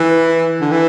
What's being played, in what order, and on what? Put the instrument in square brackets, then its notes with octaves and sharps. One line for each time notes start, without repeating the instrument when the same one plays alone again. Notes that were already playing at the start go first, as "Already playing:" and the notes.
Already playing: [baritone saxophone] E3
D3
E3